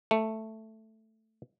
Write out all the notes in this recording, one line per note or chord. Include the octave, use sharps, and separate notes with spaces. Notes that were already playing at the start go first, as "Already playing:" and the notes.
A3